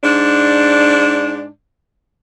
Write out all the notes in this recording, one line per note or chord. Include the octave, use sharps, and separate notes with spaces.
G#2 D4